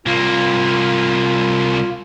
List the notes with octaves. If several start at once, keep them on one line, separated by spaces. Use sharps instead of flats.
C2 A#3 F4